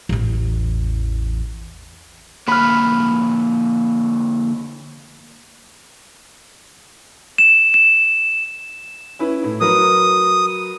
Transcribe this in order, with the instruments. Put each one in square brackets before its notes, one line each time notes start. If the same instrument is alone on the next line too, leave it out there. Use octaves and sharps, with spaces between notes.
[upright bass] A1 E2
[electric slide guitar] D3 A#3 F#5 [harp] B5 F6
[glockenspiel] E7
E7
[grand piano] C#4 E4 B4
A2 E4
[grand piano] F#3 A#4 B4 [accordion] D#6